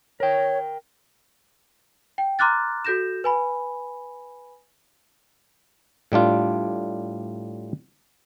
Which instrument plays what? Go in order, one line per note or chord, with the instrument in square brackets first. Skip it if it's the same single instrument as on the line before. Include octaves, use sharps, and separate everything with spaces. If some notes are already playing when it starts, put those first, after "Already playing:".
[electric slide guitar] A#4 G5 [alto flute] C#5
[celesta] G5
A#5 C6 D6 F6 F#6 A6
F#4 A4 G6 A#6 E7
B4 G#5 B5
[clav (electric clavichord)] A2 G3 D4 F4